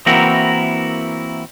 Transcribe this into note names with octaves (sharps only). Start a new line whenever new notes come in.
E3 A#3 C4 E4 F#4 A#4